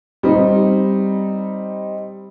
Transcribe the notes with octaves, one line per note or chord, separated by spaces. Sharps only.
G3 C4 D#4